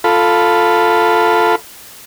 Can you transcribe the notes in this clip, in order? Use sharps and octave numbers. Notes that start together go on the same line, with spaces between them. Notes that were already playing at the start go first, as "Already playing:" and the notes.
F4 A4 B5